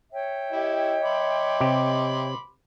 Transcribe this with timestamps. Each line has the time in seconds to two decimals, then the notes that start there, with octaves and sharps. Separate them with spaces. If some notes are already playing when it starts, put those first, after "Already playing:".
0.12 C#5 E5 G5
0.52 E4 G4 D#5
1.03 B5 C6 D6
1.61 C3 G4